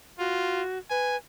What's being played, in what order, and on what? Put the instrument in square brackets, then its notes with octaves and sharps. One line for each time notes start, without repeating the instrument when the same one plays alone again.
[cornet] F4 [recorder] F#4
[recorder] B4 [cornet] G#5